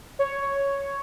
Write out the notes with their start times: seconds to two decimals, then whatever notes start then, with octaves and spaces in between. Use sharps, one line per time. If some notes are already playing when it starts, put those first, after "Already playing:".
0.19 C#5